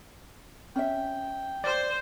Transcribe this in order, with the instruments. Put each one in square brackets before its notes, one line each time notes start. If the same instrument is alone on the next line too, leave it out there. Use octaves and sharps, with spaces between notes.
[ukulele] C#4 E5 [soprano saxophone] G5
[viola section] C5 [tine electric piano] D5